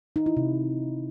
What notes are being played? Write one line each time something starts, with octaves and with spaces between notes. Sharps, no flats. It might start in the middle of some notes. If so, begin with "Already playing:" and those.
D#4
E4
C3